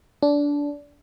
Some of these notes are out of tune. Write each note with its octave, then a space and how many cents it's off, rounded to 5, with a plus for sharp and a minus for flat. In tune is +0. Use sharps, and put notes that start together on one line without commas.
D4 -20